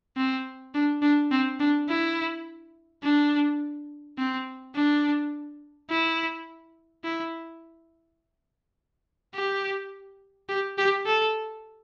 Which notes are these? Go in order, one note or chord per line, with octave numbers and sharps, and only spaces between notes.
C4
D4
D4
C4
D4
E4
D4
C4
D4
E4
E4
G4
G4
G4
A4